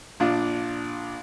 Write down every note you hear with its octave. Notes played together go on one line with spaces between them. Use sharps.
A#1 D4 F4